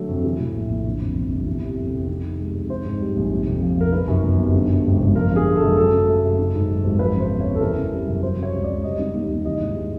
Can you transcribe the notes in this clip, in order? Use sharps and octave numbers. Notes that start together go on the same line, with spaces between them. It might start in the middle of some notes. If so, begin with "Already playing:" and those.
Already playing: D3 F#3 A3
F2
E3
A2
A#1
A#1
D3
F2
G1
G1
E3
C3
F2
F2
D#3
C3
G#3
F2
D#3 C5
G#2
G3
A#1
C3
F2
F3
F1 A#4
D#3 B4
F#2
G1
G1
D3
F#2
G#1
G#1
F3 A#4
D3
G#4
G#3
F#2 A4
F#3 A4
C#3
A3
F#2
D#3
G#2
F#3
G#1
F3 B4
C#3 C5
E2
E2 C#5
A4
E3 A#4
C#3
G3
F#2
F#3 C5
C#3 C#5
C#2
C#2 D5
G3 D#5
D#3
D#2
D#2
E3 D#5
G#2
G#3